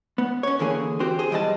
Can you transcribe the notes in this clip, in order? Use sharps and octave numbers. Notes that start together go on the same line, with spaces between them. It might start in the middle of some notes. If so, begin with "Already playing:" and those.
B3
C#4 C#5
D3 E3 A#3 G#4
C4 F#4 G4 C5
G#4 C5
B1 E3 G3 D#5 A5